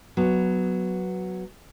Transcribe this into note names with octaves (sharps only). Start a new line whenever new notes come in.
F#3 B3